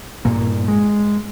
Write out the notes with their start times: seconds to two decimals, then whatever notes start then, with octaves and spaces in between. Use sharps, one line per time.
0.25 G2 A#2 A#3
0.68 G#3